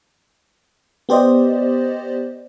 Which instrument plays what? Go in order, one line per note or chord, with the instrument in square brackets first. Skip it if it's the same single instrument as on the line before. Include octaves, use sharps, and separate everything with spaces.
[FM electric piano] B3 G4 C5 D5 D#5